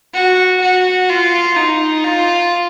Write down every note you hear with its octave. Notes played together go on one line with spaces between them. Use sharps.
F#4
F#4
F4
D#4
F4